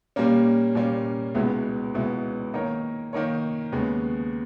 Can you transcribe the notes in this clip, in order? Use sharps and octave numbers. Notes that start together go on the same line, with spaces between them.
A#2 G3 A#3 C#4
A#2 G3 A#3 C#4
C#2 B2 G#3 B3 E4
C#2 B2 G#3 B3 E4
D#3 A#3 D#4 A#4 C#5
D#3 A#3 D#4 A#4 C#5
D#2 C#3 G#3 B3